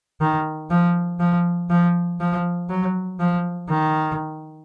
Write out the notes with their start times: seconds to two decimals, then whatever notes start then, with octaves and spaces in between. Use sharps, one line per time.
0.21 D#3
0.70 F3
1.20 F3
1.70 F3
2.20 F3
2.69 F#3
3.20 F3
3.69 D#3